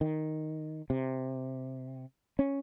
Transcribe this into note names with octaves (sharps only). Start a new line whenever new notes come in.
D#3
C3
C#4